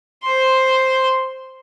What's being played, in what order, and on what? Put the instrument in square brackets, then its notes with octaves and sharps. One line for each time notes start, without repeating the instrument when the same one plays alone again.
[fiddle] C5 C6